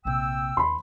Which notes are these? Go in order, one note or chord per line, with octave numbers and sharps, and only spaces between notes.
A#1 C3 G5 E6
D#2 B5 C6